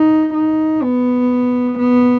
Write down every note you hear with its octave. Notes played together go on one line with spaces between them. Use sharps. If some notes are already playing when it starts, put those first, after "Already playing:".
Already playing: D#4
D#4
B3
B3